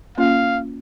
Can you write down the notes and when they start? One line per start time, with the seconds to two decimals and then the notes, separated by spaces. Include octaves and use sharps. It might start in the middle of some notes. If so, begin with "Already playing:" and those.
0.18 A#3 C#4 F4 F5